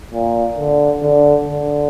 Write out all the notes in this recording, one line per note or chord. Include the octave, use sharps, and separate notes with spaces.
A#2
D3
D3
D3